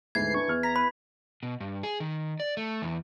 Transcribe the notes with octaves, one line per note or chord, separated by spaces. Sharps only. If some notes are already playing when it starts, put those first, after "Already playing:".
D2 G#2 E3 G#5 B5 G#6 C7
D4 C#6
E2 F6
A#5 B6
B4 B5
B2
G2
G#4
D#3
D5
A3
E2